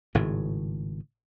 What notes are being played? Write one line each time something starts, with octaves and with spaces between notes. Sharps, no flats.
G#1 A2 C#3